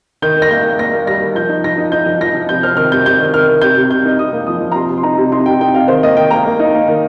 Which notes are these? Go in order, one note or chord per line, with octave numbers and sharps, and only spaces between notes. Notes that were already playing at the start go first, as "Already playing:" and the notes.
D#3 G6
D#3
A#6
A#3 G6
A#3
A#3 A#6
A#3
G3 A#6
D#3
F3 G6
D#4
F3 A#6
D#4
D#4 G6
F3
F3 A#6
F3
C3 G6
C4 F6
D#3 F6
C3 G6
C3 G6
D#3
D#3 F6
D#3
C3 G6
C3
C3 G6
D#4
C3 D#6
A#3
F3 D#6
F3
A#5
C3 C6
C3
C6
D#4 A#5
C3
D#4 C6
C3 G5
D#4 G5
C3 F5
D#3 C5
A#3 D#5
D#3 G5
A#3 A#5
A#3
D#4
A#3
D#3